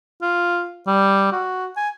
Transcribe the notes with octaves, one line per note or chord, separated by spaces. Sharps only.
F4
G3
F#4
G#5